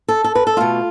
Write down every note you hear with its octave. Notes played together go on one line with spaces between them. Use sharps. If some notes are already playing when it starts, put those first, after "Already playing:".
A4
A4
B4
A4
B2 A3 F4